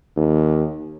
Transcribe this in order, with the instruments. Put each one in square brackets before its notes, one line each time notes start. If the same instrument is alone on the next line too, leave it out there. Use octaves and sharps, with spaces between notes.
[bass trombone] D#2